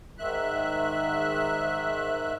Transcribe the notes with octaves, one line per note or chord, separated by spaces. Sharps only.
G#2 D#3 E5 F#6